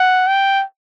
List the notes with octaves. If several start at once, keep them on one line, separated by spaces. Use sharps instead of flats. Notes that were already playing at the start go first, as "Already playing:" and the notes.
Already playing: F#5
G5